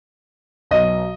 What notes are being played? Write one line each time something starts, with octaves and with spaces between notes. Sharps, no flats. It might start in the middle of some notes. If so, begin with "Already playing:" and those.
B1 B2 F#3 D#5